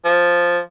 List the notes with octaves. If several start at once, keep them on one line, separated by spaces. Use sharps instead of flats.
F3